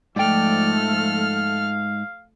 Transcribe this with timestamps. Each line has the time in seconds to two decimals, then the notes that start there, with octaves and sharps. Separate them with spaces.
0.16 G#2 F3 A3 A4 D5 G5 F6
0.89 F5